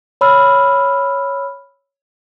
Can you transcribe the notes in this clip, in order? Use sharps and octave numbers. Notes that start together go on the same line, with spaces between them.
C#5 B5 E6 F6